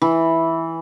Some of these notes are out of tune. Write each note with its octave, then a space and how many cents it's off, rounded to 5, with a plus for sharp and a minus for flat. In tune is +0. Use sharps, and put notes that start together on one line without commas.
E3 -5